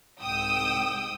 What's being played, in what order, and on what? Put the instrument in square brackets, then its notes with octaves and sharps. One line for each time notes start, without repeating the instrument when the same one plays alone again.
[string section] C2 G#2 G5 D#6 E6